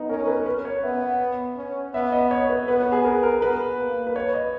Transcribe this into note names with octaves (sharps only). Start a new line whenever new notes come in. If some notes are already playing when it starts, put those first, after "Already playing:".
Already playing: B3 D#4
C#4 A#4
A#4
B4
A#4
B4
C#5
B3 E5
F#5
C#4
B3 E5
D#5
C#5
B4
B3 B4
B4
G#4
A#4
A#4
B3 B4
A#3
B4
C#5
D#5